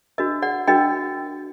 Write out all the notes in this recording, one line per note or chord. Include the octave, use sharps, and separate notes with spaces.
D4 F#4 A#4 D#5
D5 F#5
D4 F#4 A#4 D#5 G5